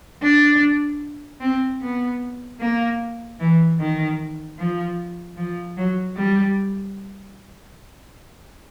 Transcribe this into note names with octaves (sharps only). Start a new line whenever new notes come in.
D4
C4
B3
A#3
E3
D#3
F3
F3
F#3
G3